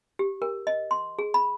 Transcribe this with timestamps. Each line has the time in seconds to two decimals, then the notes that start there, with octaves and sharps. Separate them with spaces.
0.19 G4
0.42 A#4
0.67 D#5
0.91 C6
1.19 G#4
1.34 B5